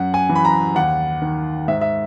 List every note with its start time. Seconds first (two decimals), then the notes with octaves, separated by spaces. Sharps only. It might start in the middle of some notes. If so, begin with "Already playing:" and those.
Already playing: F#2 F#5
0.14 G#5
0.29 E3
0.35 B5
0.45 A#5
0.75 D#2 F#5
1.22 D#3
1.68 G#2 E5
1.81 E5